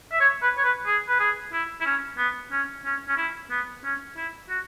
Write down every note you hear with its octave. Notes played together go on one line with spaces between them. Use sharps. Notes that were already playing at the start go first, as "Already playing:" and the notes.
E5
C#5
B4
C#5
B4
G#4
B4
G#4
E4
E4
C#4
B3
C#4
C#4
C#4
E4
B3
C#4
E4
F#4